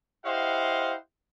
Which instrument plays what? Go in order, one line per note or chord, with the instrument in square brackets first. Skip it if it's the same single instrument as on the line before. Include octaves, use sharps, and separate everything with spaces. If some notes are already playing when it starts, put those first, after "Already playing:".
[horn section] E4 G4 C5 D#5 F5 F#5